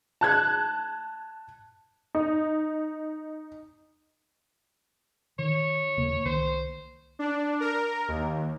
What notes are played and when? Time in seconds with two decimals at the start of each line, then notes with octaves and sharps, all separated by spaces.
0.21 A5 F#6 G#6
2.15 D#4
5.39 D#3 C#5
5.97 D#1 C#3 A#3
6.25 C2 D#3 A#3 C5
7.19 D4
7.60 A#4
8.08 D#2